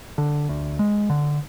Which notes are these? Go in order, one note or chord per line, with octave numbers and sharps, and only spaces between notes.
D3
D2
G#3
D3